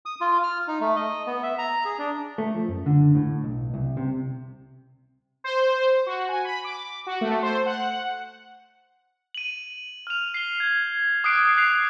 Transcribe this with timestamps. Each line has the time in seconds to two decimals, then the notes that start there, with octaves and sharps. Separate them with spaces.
0.06 D#6
0.21 F4
0.43 F6
0.68 D#4
0.81 A3
0.96 D#5
1.27 B3
1.43 E5
1.58 A#5
1.85 G#4
1.99 D4
2.38 A3
2.55 F3
2.68 F#2
2.86 D3
3.15 A2
3.44 B1
3.74 C2
3.97 C3
5.44 C5
6.06 F#4
6.29 G#5
6.45 B5
6.64 D6
7.07 F#4
7.21 A3
7.42 C5
7.66 F#5
9.35 D#7 F#7
10.07 F6 F7
10.34 C7 G7
10.60 G6 G#6
11.24 D6 D#6 F#6 C7 D7
11.57 F#6 C7 F7